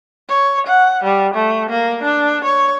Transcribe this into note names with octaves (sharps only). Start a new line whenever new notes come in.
C#5
F#5
G3
A3
A#3
D4
C#5